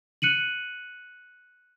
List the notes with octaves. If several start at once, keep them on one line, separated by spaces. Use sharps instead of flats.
F#6 C#7 D#7 F#7